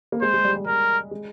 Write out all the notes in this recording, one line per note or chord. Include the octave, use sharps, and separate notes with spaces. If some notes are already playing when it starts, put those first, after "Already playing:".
A#3
G#3 C5
G#3
G3
G3
G3 A#4
G#3